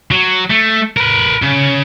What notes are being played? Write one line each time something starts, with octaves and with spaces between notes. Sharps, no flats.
F#3
A3
A#4 B4
C#3